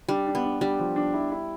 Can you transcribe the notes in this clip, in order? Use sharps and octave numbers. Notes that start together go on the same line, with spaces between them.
G3 D4
D4
B3
D4
G3 D4
F3
D4
E4
E4